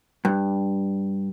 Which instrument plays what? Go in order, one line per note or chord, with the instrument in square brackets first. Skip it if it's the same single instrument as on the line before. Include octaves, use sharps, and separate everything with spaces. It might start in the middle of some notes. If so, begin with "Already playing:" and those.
[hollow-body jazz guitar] G2